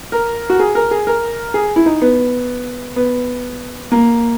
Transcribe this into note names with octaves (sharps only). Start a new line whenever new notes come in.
A#4
F#4
G#4
A#4
G#4
A#4
G#4
E4
D#4
B3
B3
A#3